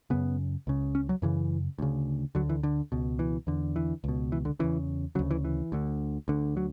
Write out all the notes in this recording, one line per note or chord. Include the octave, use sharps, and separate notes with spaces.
F#2 C#3 B3
C#2 C#3
C#4
F#3
F#2 C#3 E3
D2 C#3
D2 D3 F#3
E3
D3
C#2 B2
E3
E2 D3
E3
C#2 B2
E3
D3
E2 C#3 E3
D2 C#3 F#3
E3
E3
D2 D3
D2 D3
F#3